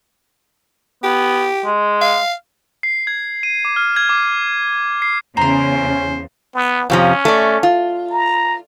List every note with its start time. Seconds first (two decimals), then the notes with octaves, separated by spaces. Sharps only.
1.03 B3 G4
1.65 G#3
2.01 F5
2.83 C7
3.07 G#6
3.43 D#7
3.65 D6
3.76 F6
3.96 G#6
4.09 D6
5.02 C7
5.37 E2 C#3 C#4 C5 A#5 C6
6.55 B3
6.90 F2 C3 F3 C#4
7.25 A3 D5
7.63 F4
8.10 A#5